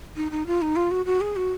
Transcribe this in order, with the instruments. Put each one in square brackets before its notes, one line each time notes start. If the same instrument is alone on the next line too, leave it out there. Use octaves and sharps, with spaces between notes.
[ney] D#4
D#4
F4
D#4
F4
F#4
F#4
G#4
F#4